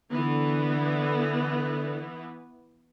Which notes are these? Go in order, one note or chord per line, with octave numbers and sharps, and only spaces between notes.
D3 E3 B3